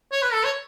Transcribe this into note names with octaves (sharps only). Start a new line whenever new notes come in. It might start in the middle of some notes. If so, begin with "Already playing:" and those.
C#5
B4
A4
C#5